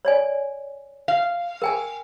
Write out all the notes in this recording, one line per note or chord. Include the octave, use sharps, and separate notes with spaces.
C#5 D5 G#5
F5
A#4 G5 G#5